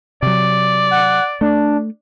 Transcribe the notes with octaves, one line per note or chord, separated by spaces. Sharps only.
C3 F#3 D5
F#5
A3 D4